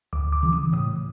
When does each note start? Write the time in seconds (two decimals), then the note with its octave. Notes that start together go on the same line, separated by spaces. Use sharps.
0.13 D2 D6
0.32 D6
0.43 C#3 E3
0.53 D#6
0.73 A2 D#6